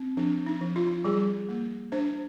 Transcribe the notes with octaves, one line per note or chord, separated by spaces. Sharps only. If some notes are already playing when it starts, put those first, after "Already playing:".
Already playing: C4
F3 D4
D#4
F3
F4
G3 G#4
A#3
D4 C5